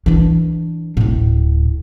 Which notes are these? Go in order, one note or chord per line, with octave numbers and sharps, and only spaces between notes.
E3 D4
D1 A2